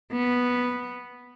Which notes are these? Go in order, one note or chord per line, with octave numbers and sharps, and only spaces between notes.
B3